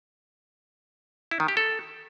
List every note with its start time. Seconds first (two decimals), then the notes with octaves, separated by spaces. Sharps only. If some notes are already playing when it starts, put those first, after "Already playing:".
1.31 E4
1.40 D#3
1.48 G4
1.57 A4